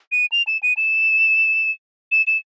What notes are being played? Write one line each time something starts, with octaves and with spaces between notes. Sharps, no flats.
D#7
F7
E7
D#7
E7
E7
E7